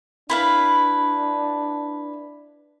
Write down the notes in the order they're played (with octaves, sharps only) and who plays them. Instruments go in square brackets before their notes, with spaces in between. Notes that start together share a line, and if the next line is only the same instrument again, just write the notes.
[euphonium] D4 [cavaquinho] E4 B4 F5